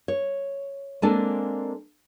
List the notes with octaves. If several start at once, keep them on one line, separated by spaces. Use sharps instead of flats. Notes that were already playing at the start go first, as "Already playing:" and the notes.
C#5
G#3 A#3 C4 D4 A4 G#5